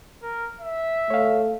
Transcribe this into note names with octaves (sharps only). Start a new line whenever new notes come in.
A#4
E5
A3 C#5 F5